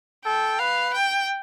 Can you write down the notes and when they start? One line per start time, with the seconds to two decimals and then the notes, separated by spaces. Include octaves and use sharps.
0.25 A4 G5
0.59 B4 F5
0.94 G5